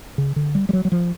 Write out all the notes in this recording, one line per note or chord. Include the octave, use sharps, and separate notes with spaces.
C#3
D3
G3
G3
F#3
F#3
F3